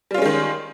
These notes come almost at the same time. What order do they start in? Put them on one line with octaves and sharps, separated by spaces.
G3 F4 C#4 G#3 D#3